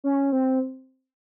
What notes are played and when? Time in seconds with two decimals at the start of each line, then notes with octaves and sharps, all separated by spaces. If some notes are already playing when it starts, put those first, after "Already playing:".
0.04 C#4
0.32 C4